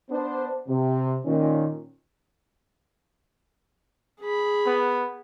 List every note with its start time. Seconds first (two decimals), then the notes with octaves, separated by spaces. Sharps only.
0.10 B3 D4 C5
0.68 C3
1.25 A#2 D#3 C#4
4.20 G#4 B5
4.66 B3